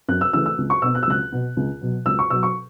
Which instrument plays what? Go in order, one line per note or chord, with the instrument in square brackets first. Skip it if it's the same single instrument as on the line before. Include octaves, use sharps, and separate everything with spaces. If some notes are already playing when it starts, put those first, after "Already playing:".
[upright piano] F#2 F#6
E6
C#3 E3 A3 C#4 E6
E6
C#2
C#6
B2 B3 E6
F#6
E6
C#2 F#6
B2 B3
C#2
B2 F#3
C#2 E6
C#6
B2 F#3 E6
C#6